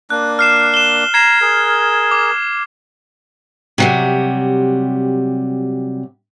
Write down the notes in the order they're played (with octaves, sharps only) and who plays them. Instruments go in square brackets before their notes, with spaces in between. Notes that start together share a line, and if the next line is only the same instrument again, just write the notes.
[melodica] A#3 D4 [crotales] F#6
[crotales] F6 C7 E7
E7 G7
[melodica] A#5 [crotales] G#6 C7 E7
[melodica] G#4 A#4
[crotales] D6
[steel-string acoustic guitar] C3 F#3 G3